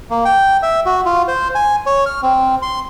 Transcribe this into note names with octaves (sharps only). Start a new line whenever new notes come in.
A#3
G5
E5
F#4
F4
C5
G#5
C#5
F6
C4
C6